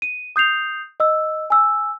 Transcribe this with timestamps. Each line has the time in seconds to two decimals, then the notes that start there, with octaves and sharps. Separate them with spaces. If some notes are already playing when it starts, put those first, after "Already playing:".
0.02 D#7
0.36 D#6 G6 C7 F7
1.00 D#5 E6
1.50 G#5 E6